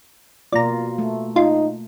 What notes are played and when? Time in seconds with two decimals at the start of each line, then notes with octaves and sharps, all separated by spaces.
0.53 B2 A#3 F4 D5 A#5
0.98 A3
1.36 D#4 F4